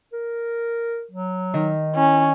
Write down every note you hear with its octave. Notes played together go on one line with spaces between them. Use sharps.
A#4
F#3
D#3
C#4 E4